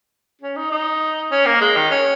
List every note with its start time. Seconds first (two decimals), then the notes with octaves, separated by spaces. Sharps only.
0.42 C#4
0.56 D#4
0.72 D#4
1.32 C#4
1.46 A#3
1.61 G#3
1.76 D#3
1.91 C#4